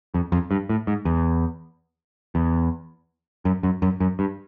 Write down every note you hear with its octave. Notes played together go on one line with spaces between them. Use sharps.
F2
F2
G2
A2
G#2
E2
E2
F#2
F#2
F#2
F#2
G2